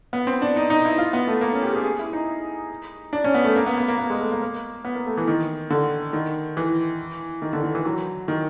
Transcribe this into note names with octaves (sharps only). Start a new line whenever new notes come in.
B3
C4
D4
D#4
D#4
E4
F4
B3
A3
A#3
C#4
G4
G#4
G#4
E4
D#4
D4
C#4
B3
A3
A#3
B3
B3
A#3
B3
G#3
A3
A#3
A#3
B3
A#3
A3
E3
D#3
D3
D#3
E3
D#3
D3
D#3
E3
F#3
D#3